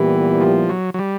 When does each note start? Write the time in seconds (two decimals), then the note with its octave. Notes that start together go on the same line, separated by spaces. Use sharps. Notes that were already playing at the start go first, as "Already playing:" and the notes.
Already playing: A#2 E3 G3 B3 E4 G4
0.41 F3
0.69 F#3
0.94 F#3
0.99 G3